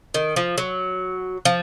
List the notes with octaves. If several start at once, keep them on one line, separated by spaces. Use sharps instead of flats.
D#3
F3
F#3
F3